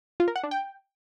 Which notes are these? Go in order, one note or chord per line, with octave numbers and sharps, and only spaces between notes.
F4
A#4
F#5
D4
G5